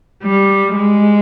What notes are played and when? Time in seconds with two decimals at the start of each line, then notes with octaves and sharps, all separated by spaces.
0.23 G3
0.75 G#3